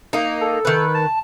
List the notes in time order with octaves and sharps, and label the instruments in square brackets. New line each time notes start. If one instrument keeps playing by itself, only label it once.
[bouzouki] A#3 D#4
[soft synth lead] A4
[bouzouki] D#3 B4
[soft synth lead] A5